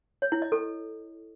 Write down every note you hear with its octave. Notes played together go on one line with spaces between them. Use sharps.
C#5
E4
D#5
A4